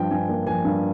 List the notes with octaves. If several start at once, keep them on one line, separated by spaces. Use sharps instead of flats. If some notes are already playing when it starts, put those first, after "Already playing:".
Already playing: G2 F3 G5
G2 G#5
A#3
F3 G#5
G2